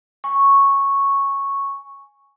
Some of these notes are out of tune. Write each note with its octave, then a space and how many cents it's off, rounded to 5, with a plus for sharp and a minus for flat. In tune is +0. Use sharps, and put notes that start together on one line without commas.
G#5 +0 C#6 -5